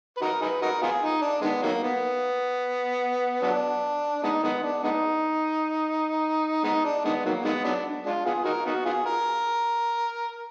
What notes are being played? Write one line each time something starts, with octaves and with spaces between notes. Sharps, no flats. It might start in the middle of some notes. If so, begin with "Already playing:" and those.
B4
D#4 F#4 A#4
D#4 G#4 B4
D#4 F#4 A#4
B3 F4 G#4
D#4
D4
D#3 G#3 B3
D#3 F#3 A#3
B3
F#3 B3 D4
G#3 B3 D#4
D#3 G#3 B3
D4
G#3 B3 D#4
G#3 B3 D#4
D4
D#3 G#3 B3
D#3 F#3 A#3
D#3 G#3 B3
F#3 B3 D4
G#3 D4 F4
B3 F4 G#4
D#4 F#4 A#4
B3 D#4 F#4
B3 F4 G#4
A#4